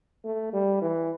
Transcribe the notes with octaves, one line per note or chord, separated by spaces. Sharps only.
A3
G3
E3